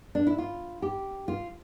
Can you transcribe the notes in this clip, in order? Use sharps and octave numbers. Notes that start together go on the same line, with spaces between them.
D4
E4
F4
G4
F4